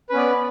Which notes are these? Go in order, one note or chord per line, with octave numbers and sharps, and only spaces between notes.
B3 C#4 B4 D5